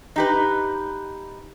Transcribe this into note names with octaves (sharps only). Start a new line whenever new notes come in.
D#4 G4 B4